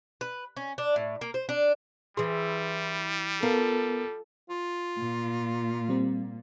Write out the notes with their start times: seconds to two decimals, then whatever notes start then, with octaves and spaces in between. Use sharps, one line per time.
0.21 B4
0.57 C#4
0.78 D4
0.96 A2
1.21 A#3
1.34 C5
1.49 D4
2.17 E3 G3 G#4 C6
3.43 B3 F4 A4 A#4
4.50 F4
4.97 A#2
5.89 G3 C4